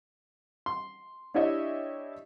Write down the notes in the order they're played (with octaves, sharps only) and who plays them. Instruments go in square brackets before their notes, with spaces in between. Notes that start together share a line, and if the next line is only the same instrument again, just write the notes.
[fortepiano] C6
D4 E4 G4 C#5 D#5 E5